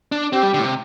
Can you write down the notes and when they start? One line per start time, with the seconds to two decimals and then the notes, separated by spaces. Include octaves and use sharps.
0.12 D4
0.33 C4 G4
0.43 G3
0.54 D3
0.59 A2
0.64 C3